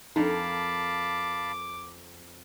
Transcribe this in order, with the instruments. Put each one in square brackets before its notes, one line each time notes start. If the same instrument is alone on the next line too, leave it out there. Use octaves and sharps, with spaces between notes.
[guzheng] F2 A#4 [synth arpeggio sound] D4 D#4 [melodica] F5 A5 B5 [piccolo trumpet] D6